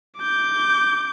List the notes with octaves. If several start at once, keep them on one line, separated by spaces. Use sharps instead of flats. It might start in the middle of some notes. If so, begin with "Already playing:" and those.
D6 G6